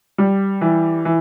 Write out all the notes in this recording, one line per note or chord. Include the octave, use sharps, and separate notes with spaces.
G3
E3
E3